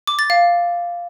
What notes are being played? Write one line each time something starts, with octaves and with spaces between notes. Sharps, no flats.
D6
A6
F5